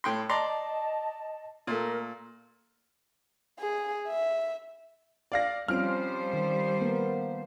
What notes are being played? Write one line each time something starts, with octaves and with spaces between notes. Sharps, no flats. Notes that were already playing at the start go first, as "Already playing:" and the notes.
A2 G5 C6
D5 D#5 A5 A#5 C6
A#2 A3 A#4
G#4
E5
D5 F5 A#6
F3 G3 C4 C#4 F4 C5 F6 D7
D#3
A#3 B3 A#4